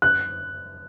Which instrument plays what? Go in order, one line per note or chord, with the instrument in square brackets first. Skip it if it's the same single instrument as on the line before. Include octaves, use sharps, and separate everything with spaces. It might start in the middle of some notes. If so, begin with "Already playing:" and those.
[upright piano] F#6